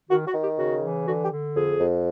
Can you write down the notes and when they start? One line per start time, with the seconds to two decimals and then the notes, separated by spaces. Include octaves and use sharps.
0.10 D#3 F#4
0.26 F#4
0.33 D#3
0.42 G4
0.58 C#3 F#4
0.82 E3
1.06 D3 F#4
1.23 G4
1.30 D3
1.55 F2 G#4
1.79 F2